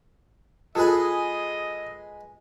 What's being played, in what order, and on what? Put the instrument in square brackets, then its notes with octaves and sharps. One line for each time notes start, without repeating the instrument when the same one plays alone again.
[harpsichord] G#3 B4 G#5 [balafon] F4 [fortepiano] G#4 A4 [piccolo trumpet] D#5